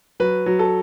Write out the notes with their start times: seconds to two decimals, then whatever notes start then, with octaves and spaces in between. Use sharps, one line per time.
0.20 F#3 B4
0.46 F#3
0.59 A4